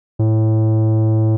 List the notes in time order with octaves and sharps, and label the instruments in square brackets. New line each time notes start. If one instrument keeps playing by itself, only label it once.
[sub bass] A2